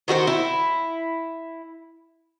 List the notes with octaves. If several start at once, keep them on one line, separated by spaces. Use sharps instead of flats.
D#3 F#4 G#4 C5
E4